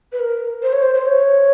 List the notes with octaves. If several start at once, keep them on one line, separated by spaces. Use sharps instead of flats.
B4
A#4
C5
C#5
C5
C5
C#5